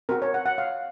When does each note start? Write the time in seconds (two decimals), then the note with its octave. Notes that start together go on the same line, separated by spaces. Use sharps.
0.09 C4 F#4 A#4
0.22 C#5
0.34 F#5
0.46 F#5
0.58 F5